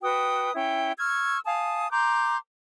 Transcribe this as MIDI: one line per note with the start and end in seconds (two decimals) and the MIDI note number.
0.02 0.52 66
0.02 0.52 71
0.02 0.52 79
0.02 0.52 87
0.55 0.92 61
0.55 0.92 64
0.55 0.92 79
0.99 1.39 85
0.99 1.39 88
0.99 1.39 89
0.99 1.39 92
1.46 1.89 77
1.46 1.89 80
1.46 1.89 81
1.46 1.89 87
1.91 2.37 82
1.91 2.37 84
1.91 2.37 86
1.91 2.37 91